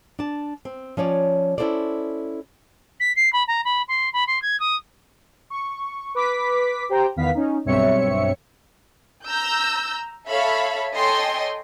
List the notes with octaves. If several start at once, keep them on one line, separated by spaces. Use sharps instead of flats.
D4 A5
C4
F3 C#4 C#5 D5
C#4 E4 F4 A4 C5 D5
B6
C7
B5
A#5
B5
C6
B5
C6
G#6
D#6
C#6
B4 D6 B6
G4 C5 G5 A#5
E2 D#3 B3 F5 B6
C#4 D#4
B1 G2 C4 C#5 E5 C#7
A#5 E6 G6
A4 C#5 E5 F5 B5
A4 C#5 D#5 G5 G#5 C6